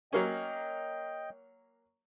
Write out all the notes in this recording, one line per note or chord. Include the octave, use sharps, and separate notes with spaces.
F#3 A#3 C#4 D#5 G5